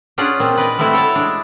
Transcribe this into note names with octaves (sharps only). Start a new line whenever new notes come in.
C#4 D4 F4 G#4 F#5
A#2 C4
B4 D5 D#5
G3 A3 B3 C4 E4 F#4
A4 C#5 E5 A5
G#3 D4